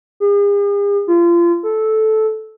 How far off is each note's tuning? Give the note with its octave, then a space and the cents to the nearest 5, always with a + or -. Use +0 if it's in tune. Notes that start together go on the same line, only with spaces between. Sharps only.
G#4 -45
F4 -30
A4 -10